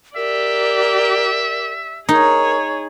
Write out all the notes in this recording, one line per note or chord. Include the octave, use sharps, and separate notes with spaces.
G4 A#4 D5 E5
D#4 G#4 A#4 C#5